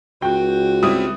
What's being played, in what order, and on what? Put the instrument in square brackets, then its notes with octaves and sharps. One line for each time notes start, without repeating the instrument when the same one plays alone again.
[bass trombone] C#2 [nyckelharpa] F#4 [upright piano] G5
[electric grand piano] G3 C4 E4 [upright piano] D#6